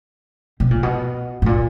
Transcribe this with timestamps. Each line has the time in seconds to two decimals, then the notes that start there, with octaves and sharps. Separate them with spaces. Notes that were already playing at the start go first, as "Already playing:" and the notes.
0.60 B2
0.71 A#2
0.83 B2
1.42 A2
1.46 A#2